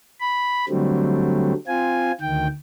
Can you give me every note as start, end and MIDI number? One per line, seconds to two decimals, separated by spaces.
0.20 0.65 83
0.69 1.53 50
0.69 1.53 54
0.69 1.53 55
0.69 1.53 57
0.69 1.53 60
1.67 2.12 60
1.67 2.12 65
1.67 2.12 80
2.21 2.47 38
2.21 2.47 51
2.21 2.47 79